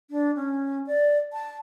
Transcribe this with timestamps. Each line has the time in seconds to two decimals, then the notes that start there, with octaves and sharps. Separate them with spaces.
0.11 D4
0.35 C#4
0.87 D5
1.33 A5